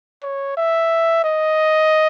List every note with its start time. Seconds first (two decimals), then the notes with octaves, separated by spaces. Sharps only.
0.23 C#5
0.57 E5
1.24 D#5